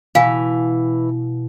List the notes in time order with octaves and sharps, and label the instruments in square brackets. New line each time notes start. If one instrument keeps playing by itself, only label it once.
[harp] B2 [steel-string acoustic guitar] E3 [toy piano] F5 G#5